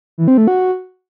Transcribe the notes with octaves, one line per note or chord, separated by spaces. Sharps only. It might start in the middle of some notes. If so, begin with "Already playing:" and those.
E3
C4
A3
F#4